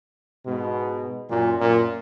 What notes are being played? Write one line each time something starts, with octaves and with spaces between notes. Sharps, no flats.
G#2 B2
F#2 A#2
F#2 A#2